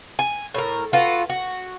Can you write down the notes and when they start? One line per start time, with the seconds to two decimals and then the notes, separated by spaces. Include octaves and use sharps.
0.19 G#5
0.54 A2 A#4
0.93 F4 F#4 A4 B4
1.30 F#4